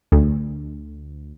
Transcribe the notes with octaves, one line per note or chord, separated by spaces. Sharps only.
D2